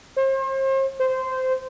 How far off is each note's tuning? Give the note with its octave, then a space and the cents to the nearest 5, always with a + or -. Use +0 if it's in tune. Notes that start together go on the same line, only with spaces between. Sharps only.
C5 +40
C5 -15